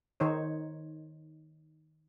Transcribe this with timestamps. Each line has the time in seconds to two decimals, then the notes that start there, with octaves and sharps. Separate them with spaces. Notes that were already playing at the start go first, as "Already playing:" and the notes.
0.20 D#3 D#4 C5 C#5